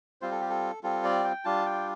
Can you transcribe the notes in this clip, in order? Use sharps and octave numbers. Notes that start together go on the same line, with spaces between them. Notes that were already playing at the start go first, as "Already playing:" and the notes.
G3 C4 F4 C5
A4
G4
A4
G3 C4 F4 A4
D5
G5
G3 D4 F4 A5
G5